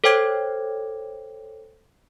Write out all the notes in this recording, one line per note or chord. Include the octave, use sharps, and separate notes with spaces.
A4 C5 C#5 G5 D6 G#6